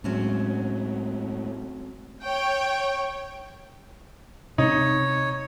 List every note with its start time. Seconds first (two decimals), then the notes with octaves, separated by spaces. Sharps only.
0.04 A2 F#3 G#3 C4 C#4
2.24 C#5 G5
4.58 C3 D#4 C#5